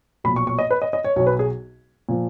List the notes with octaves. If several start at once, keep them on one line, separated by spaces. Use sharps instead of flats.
B1 A#2 F3 B5
C#6
C#6
D#5
B4
D#5
D#5
C#5
B1 B2 F#3 C#5
B4
G#4
A#2 F3